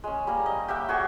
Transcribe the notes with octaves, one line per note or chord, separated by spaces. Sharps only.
G#3 C#4
G3 A#3 A#5
D#5
G4 E5 F#5 G5
F#4 G#4 C#6